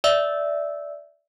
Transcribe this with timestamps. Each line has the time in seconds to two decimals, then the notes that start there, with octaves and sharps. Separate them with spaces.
0.04 D5 E5 E6